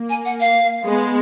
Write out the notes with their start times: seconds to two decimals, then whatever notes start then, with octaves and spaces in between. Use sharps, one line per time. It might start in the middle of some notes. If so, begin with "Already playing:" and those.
Already playing: A#3
0.09 G#5
0.25 F#5
0.40 F5
0.85 G#3 B3